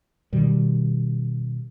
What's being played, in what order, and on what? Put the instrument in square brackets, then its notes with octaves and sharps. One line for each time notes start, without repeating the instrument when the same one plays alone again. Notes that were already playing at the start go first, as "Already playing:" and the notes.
[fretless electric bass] B2 D#3 G3